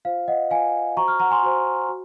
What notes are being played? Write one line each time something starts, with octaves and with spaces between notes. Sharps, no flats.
F4 C5 F5
D#5 F#5
F4 C5 F5 G#5
F#4 C5 A#5 C#6
C#6 F6
F#5 A#5
G#5 C6
F#4 C5
F#4